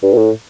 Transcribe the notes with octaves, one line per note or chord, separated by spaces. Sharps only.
G2
B2
A2